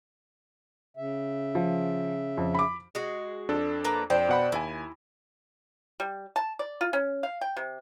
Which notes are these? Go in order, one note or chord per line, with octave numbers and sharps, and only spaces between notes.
C#3 E5
F3
F2
B5 D6
G#3 F#4
F2 D4 A4
A#3 B4 A#5
F2 D4 C5 G5
B2 F#5 B5
D#2 E4 G#5
G3
A5
D5
F4
C#4
F5
G5
C3